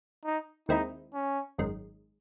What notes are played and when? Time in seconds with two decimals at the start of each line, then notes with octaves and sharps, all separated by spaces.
0.25 D#4
0.69 D#2 D#3 G#3 C4 D#4 E4
1.14 C#4
1.58 G#1 F#2 D#3 G#3